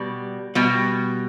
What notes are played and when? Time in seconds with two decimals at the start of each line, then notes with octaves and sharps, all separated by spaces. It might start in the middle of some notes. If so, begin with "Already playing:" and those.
Already playing: B2 G3
0.55 B2 G3